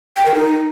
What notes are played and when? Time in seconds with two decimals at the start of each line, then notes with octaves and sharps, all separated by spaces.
0.17 G5
0.26 A#4
0.35 D#4